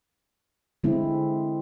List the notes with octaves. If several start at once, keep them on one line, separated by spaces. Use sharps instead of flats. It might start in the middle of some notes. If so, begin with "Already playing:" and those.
D3 G#3 C4 E4